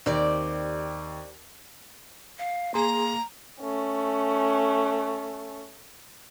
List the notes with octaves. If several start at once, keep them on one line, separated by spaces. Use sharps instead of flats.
D#2 C4 G4 D5
F5
A#3 G#4 A#5 C6
A3 C#4